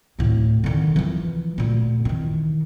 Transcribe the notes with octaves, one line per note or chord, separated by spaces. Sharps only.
D2 A2
D3 D#3
E3 F3
D2 A#2
D#3 E3